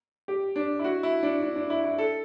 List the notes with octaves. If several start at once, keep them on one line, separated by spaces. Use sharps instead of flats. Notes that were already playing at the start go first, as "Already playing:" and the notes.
G4
D4
E4
F#4
E4
D4
D4
D4
E4
E4
A4